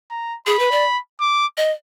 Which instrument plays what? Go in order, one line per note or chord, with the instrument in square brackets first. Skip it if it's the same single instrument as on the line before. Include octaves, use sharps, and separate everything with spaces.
[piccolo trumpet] A#5
[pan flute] G#4 [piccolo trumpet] B5
[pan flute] B4
D5
[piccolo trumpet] D6
[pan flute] D#5